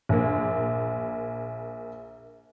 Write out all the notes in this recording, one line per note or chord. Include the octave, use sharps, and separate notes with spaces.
A#1 A#3